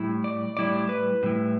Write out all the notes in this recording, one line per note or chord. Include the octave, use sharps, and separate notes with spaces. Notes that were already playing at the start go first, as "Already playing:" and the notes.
Already playing: A2 G3 E4
D5
A2 G3 E4 D5
B4
A2 G3 E4